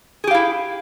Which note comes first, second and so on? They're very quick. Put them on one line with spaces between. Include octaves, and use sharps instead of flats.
G#4 G4 F5 E4